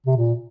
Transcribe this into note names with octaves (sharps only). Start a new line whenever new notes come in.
C3
A#2